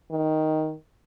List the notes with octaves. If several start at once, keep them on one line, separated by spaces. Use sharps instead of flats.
D#3